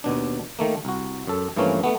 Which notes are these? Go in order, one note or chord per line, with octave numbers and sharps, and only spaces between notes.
D#2 B2 D4
D#3 A3 A#3
C2 F#4
F#2 A4
G2 E3 F3 A3 A#3 C#4
A3 B3